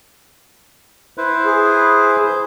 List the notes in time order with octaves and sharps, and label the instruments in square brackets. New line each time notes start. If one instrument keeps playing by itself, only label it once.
[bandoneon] E4 B4 C5
[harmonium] G#4
[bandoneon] G6